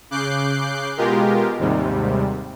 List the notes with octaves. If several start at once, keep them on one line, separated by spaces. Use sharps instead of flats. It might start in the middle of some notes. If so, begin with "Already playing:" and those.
C#3 D6 F#6 G6 C7
B2 G#3 F4 G4 A#4
D#2 G#2 C3 G3